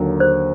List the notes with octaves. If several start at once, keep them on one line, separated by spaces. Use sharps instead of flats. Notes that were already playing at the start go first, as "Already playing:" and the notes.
Already playing: D#2 D3 F#3
C5